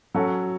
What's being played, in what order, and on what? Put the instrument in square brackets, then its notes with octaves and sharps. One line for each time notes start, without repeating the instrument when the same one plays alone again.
[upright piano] F#3 C#4 F#4 A4